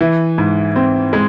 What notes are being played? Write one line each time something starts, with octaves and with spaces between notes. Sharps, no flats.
E3
G#2
C4
G#3